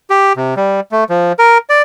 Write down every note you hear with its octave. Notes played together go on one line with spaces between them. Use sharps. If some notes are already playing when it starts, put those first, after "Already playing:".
G4
C3
G3
A3
F3
A#4
D5